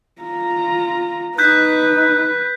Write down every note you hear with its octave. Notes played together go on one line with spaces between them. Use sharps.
F4 A#5
D#4 B4 F#6 G6 B6